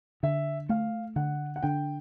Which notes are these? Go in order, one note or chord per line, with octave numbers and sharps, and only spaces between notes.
D3 E5
A3 F5
D3 F#5
F#5
D3 G5